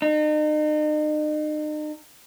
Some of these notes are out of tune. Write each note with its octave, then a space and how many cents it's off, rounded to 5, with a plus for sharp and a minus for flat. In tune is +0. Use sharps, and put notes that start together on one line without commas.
D#4 -40